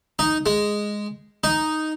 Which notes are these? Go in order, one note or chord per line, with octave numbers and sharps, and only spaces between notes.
D#4
G#3
D#4